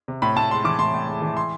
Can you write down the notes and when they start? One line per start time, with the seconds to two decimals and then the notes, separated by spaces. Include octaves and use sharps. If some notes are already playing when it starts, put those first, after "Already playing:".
0.08 C3
0.22 A2 B5
0.36 A2 A5
0.51 G#3 C6
0.64 E3 D6
0.79 A2 C6
0.94 A2
1.08 G#3
1.22 E3
1.37 C6